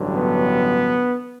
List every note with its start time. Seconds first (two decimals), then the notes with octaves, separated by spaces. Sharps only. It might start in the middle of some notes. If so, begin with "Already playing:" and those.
Already playing: A1 G2 D3 F#3
0.15 B3